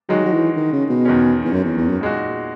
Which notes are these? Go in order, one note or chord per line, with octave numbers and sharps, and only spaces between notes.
D#3 F#3 G#3 D#4 F#4
F#3
E3
D#3
C#3
B2
E2 D#3 G#3 C#4
E2
F#2
E2
E2
F#2
A#2 G#3 D#4 F#4